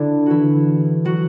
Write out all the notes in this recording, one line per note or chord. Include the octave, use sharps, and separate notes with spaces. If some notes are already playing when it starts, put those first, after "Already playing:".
Already playing: D3 D4 E4
E3 E4 F#4
F#3 F#4